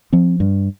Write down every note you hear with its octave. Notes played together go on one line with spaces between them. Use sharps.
F3 C4
G2